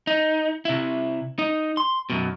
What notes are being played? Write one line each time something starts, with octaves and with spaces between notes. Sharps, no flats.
D#4
C3 E4
D#4
C6
F#2 B2